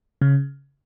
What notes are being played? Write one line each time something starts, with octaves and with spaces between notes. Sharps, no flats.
C#3